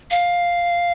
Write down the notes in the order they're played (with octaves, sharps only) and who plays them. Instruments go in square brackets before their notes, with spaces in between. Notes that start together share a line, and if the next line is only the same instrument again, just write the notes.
[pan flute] F5